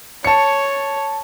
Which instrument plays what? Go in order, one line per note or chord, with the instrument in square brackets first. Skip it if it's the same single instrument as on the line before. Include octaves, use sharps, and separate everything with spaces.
[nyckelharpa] C#5 [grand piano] A5 C#7